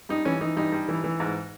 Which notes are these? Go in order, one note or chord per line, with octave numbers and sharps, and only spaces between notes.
G2 D#4
E3 C#4
E3 D#4
G2 D#4
G2
E3
E3
G#2